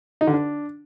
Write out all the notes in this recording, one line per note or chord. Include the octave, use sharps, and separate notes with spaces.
D#4
D3
D4